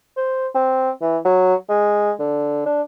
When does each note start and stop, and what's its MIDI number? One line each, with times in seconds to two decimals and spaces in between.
0.17 0.48 72
0.55 0.90 60
1.01 1.17 52
1.25 1.55 54
1.69 2.12 56
2.19 2.65 50
2.66 2.81 62